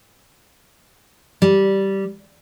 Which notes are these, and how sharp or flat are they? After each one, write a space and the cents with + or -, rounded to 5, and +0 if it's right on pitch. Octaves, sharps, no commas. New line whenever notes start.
G3 -10